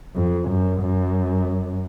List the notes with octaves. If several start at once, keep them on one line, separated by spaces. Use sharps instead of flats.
F2
F#2
F#2